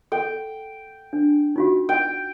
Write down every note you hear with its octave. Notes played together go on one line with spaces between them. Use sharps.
A4 G5
D4
D#4 F4 F#4
G5